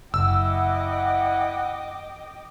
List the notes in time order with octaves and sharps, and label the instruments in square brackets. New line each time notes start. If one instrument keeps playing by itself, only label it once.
[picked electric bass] F#1 [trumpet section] E4 F#5 [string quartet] D#5 G5 D6 [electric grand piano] E6